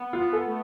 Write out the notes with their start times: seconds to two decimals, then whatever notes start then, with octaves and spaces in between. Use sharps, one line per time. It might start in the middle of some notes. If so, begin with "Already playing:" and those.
Already playing: B3
0.13 F4
0.19 B3
0.33 A4
0.46 A3